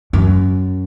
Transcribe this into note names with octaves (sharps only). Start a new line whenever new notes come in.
F#2